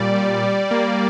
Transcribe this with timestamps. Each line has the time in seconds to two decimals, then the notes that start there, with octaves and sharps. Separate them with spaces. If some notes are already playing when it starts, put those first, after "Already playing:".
Already playing: A#2 G3 D5
0.15 G3
0.43 G3
0.71 A#3